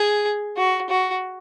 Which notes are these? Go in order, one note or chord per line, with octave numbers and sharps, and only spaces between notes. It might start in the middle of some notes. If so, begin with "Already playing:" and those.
Already playing: G#4
F#4
F#4